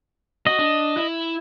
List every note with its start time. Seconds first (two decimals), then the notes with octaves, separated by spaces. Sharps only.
0.47 F#4 D#5
0.59 D4
0.97 E4